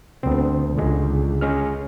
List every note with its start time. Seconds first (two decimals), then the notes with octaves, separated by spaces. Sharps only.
0.23 D2 B3 C4
0.78 C#2 D3 G#3
1.41 G#3 C#4 F6